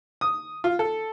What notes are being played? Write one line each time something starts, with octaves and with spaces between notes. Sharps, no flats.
D#6
F4
A4